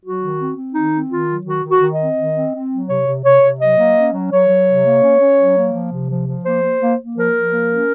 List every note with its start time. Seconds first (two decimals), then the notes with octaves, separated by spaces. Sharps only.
0.04 F#3 F#4
0.21 D#3
0.39 C4
0.57 C4
0.74 D#3 D#4
0.93 C4
1.10 D#3 F4
1.28 F#3
1.45 D#3 F#4
1.64 D#3
1.70 F#4
1.81 D#3
1.93 D#5
1.99 C4
2.17 D#3
2.35 C4
2.53 C4
2.71 F#3
2.88 C3 C#5
3.06 C3
3.24 C3 C#5
3.42 C3
3.60 F#3 D#5
3.78 A#3
3.96 C#4
4.13 F#3
4.32 F#3 C#5
4.49 F#3
4.68 C3
4.85 A#3
5.03 C#4
5.20 C#4
5.38 F#3
5.57 A#3
5.73 F3
5.92 C3
6.10 F3
6.27 F3
6.45 A#3 C5
6.63 A#3
6.81 A#3
6.99 A#3
7.16 F3 A#4
7.35 F3
7.52 A#3
7.70 C#4